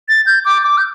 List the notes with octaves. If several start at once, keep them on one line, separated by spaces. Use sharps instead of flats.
A6
G6
D6
D6
G6